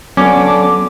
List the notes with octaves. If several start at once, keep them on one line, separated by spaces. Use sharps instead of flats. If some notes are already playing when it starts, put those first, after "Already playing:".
D3 F#3 B3 C#4 D6